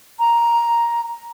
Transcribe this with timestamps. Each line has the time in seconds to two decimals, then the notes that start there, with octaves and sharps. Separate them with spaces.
0.20 A#5